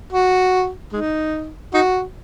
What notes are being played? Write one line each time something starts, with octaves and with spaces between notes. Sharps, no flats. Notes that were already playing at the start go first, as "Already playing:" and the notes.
F#4
G#3 D#4
D#4 F#4